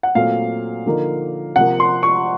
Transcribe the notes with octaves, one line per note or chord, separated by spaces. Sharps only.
F#5
A#2 F#3 A3 C4 F5
D3 F3 A#3 D#4
C3 F3 A#3 F#5
C6
C#6